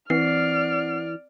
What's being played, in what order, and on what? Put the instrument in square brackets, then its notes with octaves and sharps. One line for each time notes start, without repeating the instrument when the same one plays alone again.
[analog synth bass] E3 [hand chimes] C4 C7 [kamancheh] D5 F6